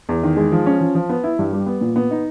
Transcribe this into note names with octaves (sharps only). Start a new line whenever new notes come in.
E2
D#3
G#3
F3
C#4
F3
F3
B3
E4
G2
G3
B3
A#2
B3
D#4